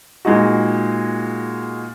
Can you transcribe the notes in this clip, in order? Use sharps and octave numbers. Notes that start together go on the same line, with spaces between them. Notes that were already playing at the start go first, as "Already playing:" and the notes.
A#2 G#3 D#4 F#4